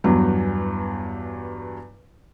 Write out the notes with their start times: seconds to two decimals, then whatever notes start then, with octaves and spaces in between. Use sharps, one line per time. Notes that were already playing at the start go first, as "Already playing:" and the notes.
0.04 E2 G2 F#3